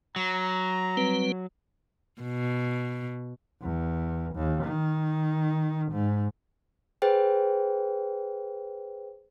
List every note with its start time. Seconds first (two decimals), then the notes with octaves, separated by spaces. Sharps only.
0.16 F#3 A#5
0.97 G3 C4 B4
2.22 B2
3.62 E2
4.35 D#2
4.64 D#3
5.92 G#2
7.02 G#4 B4 C5 G5